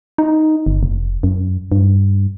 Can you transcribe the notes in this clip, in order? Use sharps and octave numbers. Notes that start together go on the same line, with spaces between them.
D#4
G1
F1
F#2
G2